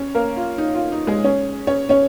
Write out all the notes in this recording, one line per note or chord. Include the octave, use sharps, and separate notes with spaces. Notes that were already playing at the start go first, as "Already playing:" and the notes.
Already playing: C#4 C#5
A#3 A#4
F4
D#4
F4
D#4
G#3 G#4
C#4 C#5
C#4 C#5
C#4 C#5